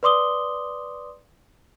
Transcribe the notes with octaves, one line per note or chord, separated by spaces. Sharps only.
B4 D5 C6 D6 D#6 G7